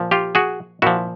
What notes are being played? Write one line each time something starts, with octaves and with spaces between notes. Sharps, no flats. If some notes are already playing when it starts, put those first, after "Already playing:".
Already playing: A#2 F3
F4 G4
F#4 G#4
A#2 F3 E4 F#4